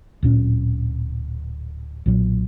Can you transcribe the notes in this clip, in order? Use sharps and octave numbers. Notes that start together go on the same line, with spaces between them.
D1 A#2 C#4
B1 A#2 F#3